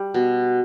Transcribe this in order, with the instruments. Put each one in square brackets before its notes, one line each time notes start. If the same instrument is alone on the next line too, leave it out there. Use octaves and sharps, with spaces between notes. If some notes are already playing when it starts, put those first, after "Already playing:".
Already playing: [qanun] G3
B2